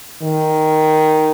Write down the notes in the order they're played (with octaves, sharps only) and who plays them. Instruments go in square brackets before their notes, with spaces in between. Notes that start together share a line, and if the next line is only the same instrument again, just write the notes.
[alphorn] D#3